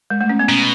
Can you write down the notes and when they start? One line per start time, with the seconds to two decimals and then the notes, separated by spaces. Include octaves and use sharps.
0.10 G#3
0.21 A3
0.29 C#4
0.39 B3
0.48 B2 C#4